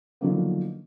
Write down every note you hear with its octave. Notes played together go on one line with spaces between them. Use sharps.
D3 D#3 F3 F#3 A#3 B3